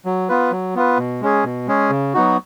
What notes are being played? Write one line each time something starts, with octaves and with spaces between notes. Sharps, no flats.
F#3
B3 F4 B4
F#3
B3 F4 B4
B2
G#3 C#4 G#4
B2
G#3 C#4 G#4
C#3
F#3 B3 D#4 F#4